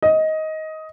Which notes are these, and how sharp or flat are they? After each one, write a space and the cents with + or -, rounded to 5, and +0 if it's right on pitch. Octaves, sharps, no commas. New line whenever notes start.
D#5 +15